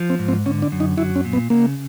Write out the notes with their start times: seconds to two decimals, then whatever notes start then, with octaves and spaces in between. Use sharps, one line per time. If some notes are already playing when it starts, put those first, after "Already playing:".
Already playing: F3
0.10 C4
0.19 G#2
0.28 C4
0.46 D3 C#4
0.62 D4
0.72 F#2
0.80 D#4
0.98 F#3 E4
1.16 C#4
1.25 A#2
1.33 B3
1.50 C#3 A#3